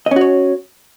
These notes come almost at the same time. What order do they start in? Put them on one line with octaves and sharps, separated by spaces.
D#5 C#4 F#4 C#5